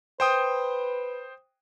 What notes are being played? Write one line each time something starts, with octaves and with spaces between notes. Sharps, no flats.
B4 C5 G5 D#6